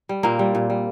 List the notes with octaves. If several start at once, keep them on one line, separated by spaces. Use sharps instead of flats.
G3
A#2 A#3 C4
G3
A#2
G3